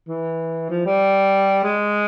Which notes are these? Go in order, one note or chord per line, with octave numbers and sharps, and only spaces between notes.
E3
F3
G3
G#3